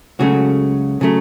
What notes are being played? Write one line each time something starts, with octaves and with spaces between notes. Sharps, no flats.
C#2 C#3 F#3 A3 F#4
C#3 F#3 A3